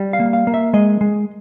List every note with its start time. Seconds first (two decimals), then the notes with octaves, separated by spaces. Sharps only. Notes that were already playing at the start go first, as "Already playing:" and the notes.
Already playing: G3
0.13 F5
0.20 A#3
0.33 F5
0.47 A#3
0.54 E5
0.73 G#3 D#5
1.01 G#3